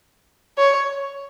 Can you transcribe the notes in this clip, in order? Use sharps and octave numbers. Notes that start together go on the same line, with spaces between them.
C#5